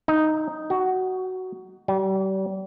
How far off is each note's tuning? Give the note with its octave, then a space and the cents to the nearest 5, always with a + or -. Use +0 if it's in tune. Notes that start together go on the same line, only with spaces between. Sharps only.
D#4 +0
F#4 +10
G3 -35